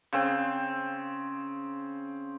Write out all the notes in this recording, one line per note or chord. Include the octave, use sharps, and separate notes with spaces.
C#3 C4